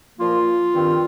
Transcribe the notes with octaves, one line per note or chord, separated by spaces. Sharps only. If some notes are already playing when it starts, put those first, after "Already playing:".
A#2 F3 A#3 F4
G2 D#3 C4